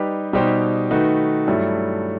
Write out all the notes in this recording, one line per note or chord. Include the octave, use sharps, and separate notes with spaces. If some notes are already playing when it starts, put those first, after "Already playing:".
Already playing: G3 D#4 G4 B4
B2 G3 D#4 G4 C5
D#3 A3 D#4 F#4 B4
G2 F#3 A3 E4